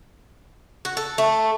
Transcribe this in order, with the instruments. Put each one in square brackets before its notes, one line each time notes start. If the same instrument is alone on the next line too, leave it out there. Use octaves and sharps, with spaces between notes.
[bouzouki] F#4
A4
A3